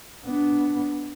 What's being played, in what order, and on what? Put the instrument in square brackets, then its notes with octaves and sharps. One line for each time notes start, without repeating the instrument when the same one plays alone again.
[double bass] B3 D4